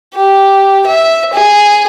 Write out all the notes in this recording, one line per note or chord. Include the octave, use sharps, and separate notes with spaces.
G4
E5
G#4